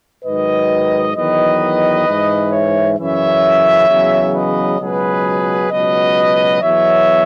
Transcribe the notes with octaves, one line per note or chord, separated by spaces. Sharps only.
G#2 D#3 F#3 B4 D#5
E2 D#3 F#3 B4 D#5
G#2 E3
C#5 E5
F#2 C#3 E3 C#5 E5
E2 C#3 F#3
B4 D#5
C#2 B2 F#3 G#4 B4
C#2 B2 F#3 B4 D#5
E2 B2 F#3 C#5 E5